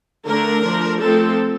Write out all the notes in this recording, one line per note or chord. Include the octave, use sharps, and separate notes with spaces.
D3 A3 D4 A#4
F3 A3 D4
F3 A3 C4 A4